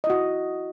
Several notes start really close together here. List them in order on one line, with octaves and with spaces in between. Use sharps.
D#5 E4 F#4